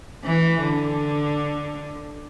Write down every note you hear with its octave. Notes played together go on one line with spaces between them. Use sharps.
E3
D3